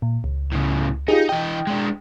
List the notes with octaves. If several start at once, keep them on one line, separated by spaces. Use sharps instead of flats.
A#2
C#2
A2 C#3
D#4 F4 G4 G#4
E3 D#5 G5
G#3 D4